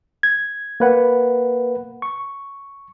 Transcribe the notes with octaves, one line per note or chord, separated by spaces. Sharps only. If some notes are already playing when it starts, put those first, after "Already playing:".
G#6
A#3 B4 F#5
C#6